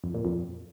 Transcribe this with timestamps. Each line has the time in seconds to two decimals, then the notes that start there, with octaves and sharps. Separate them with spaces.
0.04 F2
0.14 A#2
0.25 F2